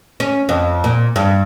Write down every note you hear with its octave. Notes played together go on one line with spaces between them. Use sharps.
C#4
F2
A#2
G2